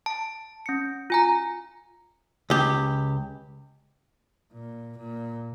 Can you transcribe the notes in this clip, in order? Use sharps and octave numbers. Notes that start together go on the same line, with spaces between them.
A5
C#4 C#7
F4 G#5 A#5
C#2 G4
A#2
A#2